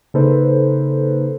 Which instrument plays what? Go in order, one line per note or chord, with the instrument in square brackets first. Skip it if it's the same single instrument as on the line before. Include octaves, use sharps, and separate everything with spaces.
[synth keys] C#3 A#3 D#4 A4 B4 C5